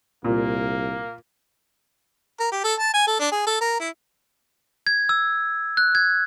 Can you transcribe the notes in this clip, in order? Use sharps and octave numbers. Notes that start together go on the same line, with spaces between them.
C2 A#2 A#3
A#4
G4
A4
A5
G#5
A4
D4
G#4
A4
A#4
E4
G#6
E6
F#6
G#6